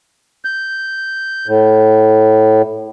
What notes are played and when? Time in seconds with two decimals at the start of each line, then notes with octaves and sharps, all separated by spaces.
0.45 G6
1.48 A2